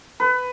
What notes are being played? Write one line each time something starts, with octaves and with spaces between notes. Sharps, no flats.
B4